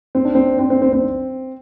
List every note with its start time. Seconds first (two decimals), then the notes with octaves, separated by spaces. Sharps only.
0.15 C4
0.25 D4
0.35 C4
0.59 C4
0.70 C4
0.82 C4
0.93 C4